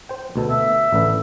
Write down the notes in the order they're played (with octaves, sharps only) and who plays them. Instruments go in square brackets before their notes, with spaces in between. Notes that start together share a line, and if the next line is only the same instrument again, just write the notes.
[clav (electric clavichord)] C5 G5
D2 B2 A4
[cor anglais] E5
[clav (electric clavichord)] A1 D3 B4